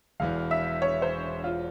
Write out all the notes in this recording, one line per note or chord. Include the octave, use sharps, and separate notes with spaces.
E1 E2 E3 F5
E5
C#5
C5
F4